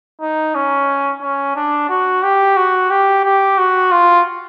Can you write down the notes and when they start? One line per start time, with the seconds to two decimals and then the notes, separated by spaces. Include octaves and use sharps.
0.21 D#4
0.55 C#4
1.22 C#4
1.56 D4
1.90 F#4
2.23 G4
2.57 F#4
2.90 G4
3.25 G4
3.58 F#4
3.92 F4